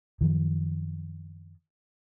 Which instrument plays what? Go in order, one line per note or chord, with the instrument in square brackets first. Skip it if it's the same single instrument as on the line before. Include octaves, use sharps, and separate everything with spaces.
[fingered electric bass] F#2 D#3 F3